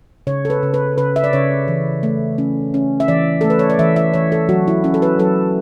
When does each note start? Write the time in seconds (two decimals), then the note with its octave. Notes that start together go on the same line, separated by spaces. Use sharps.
0.27 C#3 C#5
0.45 A4
0.50 B4
0.63 C#3
0.74 B4
0.98 C#3 B4
1.16 E5
1.24 D5
1.33 C#3 C#5
1.68 E3
2.03 A3
2.38 C#4
2.74 C#4
3.00 E5
3.08 E3 D5
3.41 A3 A4
3.50 B4
3.59 C#5
3.70 D5
3.79 E3 E5
3.96 E5
4.14 E3 C#5
4.32 A4
4.49 F#3 F#4
4.68 E4
4.84 C#4 E4
4.94 A4
5.02 B4
5.19 F#3 A4